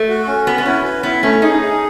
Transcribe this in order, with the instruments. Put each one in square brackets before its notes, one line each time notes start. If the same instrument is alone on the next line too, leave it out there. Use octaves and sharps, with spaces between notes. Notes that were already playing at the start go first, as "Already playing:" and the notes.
Already playing: [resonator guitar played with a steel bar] A3
[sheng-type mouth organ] F#4
C#4
[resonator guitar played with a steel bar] B3 [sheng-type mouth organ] F#4
[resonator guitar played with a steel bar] B3
[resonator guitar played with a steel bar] C#4 [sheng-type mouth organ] E4
[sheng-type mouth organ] B4
[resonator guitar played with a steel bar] B3 [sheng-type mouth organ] E4
[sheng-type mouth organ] A3 [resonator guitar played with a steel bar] C#4
[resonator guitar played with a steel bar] D#4 [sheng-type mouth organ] G#4
[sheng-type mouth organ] G#4